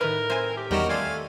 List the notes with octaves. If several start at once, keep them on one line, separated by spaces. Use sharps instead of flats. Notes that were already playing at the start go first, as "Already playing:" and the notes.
A2 D#3 A#4 B4
C4 C5 E5 G#5
G4
E2 D#3 G3 C#4 F#4 A#4 G5 E7
A3 D5 F5 G#5 C6 E6